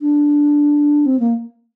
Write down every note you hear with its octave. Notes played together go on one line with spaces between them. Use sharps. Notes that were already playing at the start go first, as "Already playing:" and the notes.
D4
C4
A#3